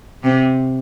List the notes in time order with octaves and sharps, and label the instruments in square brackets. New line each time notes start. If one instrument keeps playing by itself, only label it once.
[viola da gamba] C3